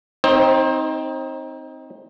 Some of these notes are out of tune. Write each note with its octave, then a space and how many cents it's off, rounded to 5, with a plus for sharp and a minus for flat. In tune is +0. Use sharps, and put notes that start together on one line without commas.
C4 +0 D#4 +15 C5 +35